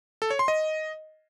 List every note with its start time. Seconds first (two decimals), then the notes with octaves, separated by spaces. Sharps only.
0.22 A4
0.30 C#5
0.39 C6
0.48 D#5